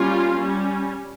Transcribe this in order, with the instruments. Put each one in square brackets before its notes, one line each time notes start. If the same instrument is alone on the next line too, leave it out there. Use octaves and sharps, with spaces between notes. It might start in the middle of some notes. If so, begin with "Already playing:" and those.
Already playing: [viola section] G3 A#3 C#4 F4
G3 C#4